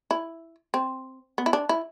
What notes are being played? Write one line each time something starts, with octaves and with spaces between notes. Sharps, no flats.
E4
C4
B3
E4
D4
E4